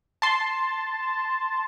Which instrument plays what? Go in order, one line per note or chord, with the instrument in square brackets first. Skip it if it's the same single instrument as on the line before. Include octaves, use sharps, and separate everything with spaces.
[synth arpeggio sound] A5 C6